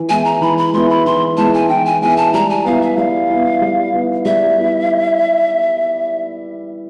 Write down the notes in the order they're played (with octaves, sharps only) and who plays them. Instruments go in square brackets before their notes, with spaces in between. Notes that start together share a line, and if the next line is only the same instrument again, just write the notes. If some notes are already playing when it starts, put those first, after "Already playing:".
Already playing: [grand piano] E3
[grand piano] G#3 B3 E4 [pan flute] G#5
[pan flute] A#5
[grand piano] E3 [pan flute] B5
[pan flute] B5
[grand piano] G#3 B3 E4 [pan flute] C6
[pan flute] B5
[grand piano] E3 [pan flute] C6
[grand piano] G#3 B3 E4 [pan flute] A5
[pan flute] G#5
[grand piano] E3 [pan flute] G5
[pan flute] G#5
[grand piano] G#3 B3 E4 [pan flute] G#5
[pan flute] A5
[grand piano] G3 [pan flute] A#5
[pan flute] G#5
[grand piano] B3 E4 [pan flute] F5
[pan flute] E5
[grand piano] G3 [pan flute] F5
[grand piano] B3 E4
G3
B3 E4
[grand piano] G3 [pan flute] E5
[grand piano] B3 E4